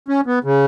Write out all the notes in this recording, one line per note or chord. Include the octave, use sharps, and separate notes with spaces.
C#4
B3
C#3